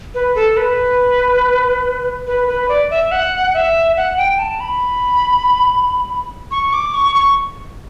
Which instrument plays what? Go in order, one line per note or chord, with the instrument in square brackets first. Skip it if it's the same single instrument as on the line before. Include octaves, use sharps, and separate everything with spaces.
[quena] B4
A4
B4
B4
B4
D5
E5
F#5
E5
F#5
G5
A5
B5
C#6
D6
C#6
C#6